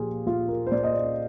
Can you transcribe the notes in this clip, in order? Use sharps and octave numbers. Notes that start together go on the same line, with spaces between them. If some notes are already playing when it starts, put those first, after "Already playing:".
Already playing: A#2 F3 F4 G4 G#4
A#2 F4
A#4
C5
A#2 D5
D#5
D5